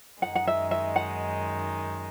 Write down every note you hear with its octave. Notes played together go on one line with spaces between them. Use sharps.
F#2 D#3 G#3 D#4 F#5
F#5
E5
E5
F#5